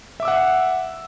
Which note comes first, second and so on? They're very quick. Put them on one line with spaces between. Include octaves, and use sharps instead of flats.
E5 D6 E6 F#5